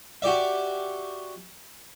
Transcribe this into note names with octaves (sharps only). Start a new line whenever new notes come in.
F#4 G4 D5 E5